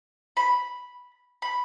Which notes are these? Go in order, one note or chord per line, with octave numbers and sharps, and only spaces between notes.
B5
B5